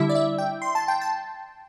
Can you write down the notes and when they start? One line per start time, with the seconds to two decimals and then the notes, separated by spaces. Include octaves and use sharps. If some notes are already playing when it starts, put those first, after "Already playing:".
Already playing: D3 G3 E4 E5
0.09 D5
0.15 E5
0.38 G5
0.62 C6
0.75 A5
0.88 G5
1.01 A5